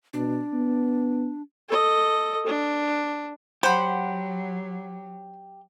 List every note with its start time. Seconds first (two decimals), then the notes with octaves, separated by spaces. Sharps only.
0.13 B2 D4
0.53 B3
1.69 A4 D#5
2.47 D4
3.63 F#3 G4 C5 F#5 B5